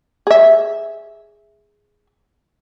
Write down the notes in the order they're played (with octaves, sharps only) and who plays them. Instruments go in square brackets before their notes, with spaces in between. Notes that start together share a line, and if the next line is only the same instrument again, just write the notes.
[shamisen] G#4 E5